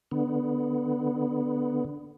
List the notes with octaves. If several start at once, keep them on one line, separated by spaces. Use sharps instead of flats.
D3 B3